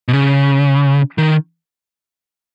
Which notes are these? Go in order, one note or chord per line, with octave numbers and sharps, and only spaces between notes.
B2
C#3
D#3